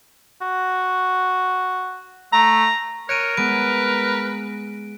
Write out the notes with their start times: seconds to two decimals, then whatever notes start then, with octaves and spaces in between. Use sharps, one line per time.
0.41 F#4
2.33 A3 A#5
3.09 A#4 C#5 F#6 D7 D#7
3.37 G#3 B3 B4 D7